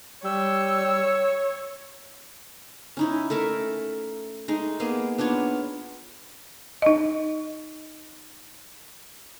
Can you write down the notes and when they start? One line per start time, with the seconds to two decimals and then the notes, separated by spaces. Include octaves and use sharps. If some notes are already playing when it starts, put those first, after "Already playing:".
0.24 G3 C#5 E6
2.97 C#4 D#4 E4
3.30 A3 A4 A#4 E5
4.48 G#3 A3 D#4
4.80 A#3 B3 G#4
5.18 B3 D4 F4 C#5
6.82 D#4 D#5